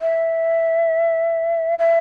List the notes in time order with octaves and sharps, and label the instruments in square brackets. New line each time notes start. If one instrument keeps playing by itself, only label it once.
[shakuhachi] E5
E5